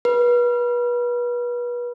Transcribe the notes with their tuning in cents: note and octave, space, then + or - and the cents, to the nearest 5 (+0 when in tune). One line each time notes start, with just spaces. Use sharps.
B4 -35